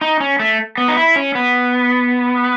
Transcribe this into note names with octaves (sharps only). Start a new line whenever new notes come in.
D#4
C#4
A3
B3
D#4
E4
C#4
B3